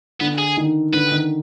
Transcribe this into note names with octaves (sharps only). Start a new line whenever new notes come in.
D3 B3
G#4
D#3
D3 B4
D#3